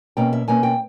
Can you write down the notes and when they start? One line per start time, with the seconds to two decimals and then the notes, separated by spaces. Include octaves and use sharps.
0.17 B2 A#3 C#4 G5
0.33 E5
0.48 B2 A#3 C#4 G#5
0.63 G5